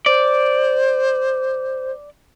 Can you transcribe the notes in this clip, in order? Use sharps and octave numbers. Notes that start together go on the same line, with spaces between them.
C5 D5